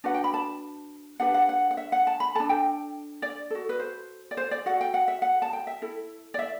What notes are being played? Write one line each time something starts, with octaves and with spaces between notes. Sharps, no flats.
D4 F#4 B4 F#5
G5
B5
A5
D4 G4 B4 F#5
F#5
F#5
F#5
E5
F#5
A5
B5
D4 A4 A5
G5
D5
F#4 A4
B4
C5
D5
C5
D5
F#4 A4 F#5
G5
F#5
E5
F#5
A5
G5
E5
E4 A4
D5
E5